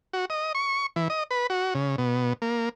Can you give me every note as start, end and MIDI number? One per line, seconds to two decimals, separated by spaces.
0.13 0.25 66
0.30 0.52 75
0.55 0.86 85
0.96 1.08 52
1.10 1.23 75
1.31 1.47 71
1.50 1.74 66
1.75 1.96 49
1.98 2.33 47
2.42 2.69 58